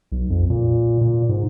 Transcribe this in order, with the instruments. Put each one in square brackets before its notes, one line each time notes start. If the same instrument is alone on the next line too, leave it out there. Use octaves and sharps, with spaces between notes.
[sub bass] B1
F2
A#2
A#2
G#2